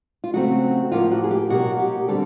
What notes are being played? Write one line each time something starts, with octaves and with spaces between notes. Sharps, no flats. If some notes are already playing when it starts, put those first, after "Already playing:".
F4
C#3 F#3 A3 C4 F#4
A2 F3 A#3 F4
F#4
G#4
G4
B2 F#3 A#3 F#4
G4
D3 G3 C4 A4